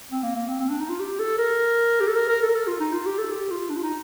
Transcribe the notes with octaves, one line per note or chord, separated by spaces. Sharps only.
C4
A#3
A#3
C4
C4
D4
D#4
F4
G4
A4
A#4
G4
A4
A#4
A#4
A4
A#4
A4
F4
D#4
F4
G4
A4
G4
F4
D4
F4
D#4